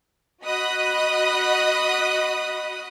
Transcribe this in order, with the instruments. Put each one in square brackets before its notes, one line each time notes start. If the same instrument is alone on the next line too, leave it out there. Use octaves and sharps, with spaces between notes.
[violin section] F#4 D#5 B5 D#6 F#6